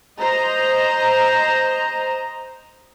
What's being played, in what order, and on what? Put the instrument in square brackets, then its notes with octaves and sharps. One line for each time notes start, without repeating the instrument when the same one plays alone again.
[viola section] C5 D#5 A#5